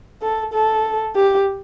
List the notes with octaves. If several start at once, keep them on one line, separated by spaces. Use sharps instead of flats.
A4
A4
G4